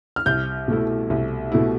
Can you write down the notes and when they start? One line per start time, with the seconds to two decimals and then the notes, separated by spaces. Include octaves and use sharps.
0.16 F6
0.26 C2 G6
0.68 B2 A3 E4
1.10 C2
1.52 B2 A3 E4